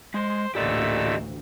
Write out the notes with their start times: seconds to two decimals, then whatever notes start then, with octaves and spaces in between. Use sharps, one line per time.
0.14 G#3 C5
0.55 A1 D2 A#2 A3 G4 D5 D#5 E6